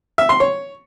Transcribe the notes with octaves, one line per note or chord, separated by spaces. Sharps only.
E5
C6
C#5